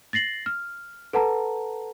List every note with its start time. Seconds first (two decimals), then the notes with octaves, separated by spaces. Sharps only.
0.13 A6 A#6 C7 F#7
0.46 F6
1.13 A4 B4 F#5 A5 A#5